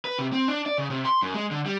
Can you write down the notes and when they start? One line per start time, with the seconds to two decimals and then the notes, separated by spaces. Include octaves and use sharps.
0.05 B4
0.19 C3
0.33 C4
0.48 D4
0.66 D5
0.78 C#3
0.90 C3
1.05 C6
1.22 F#2
1.34 G#3
1.51 D3
1.66 G3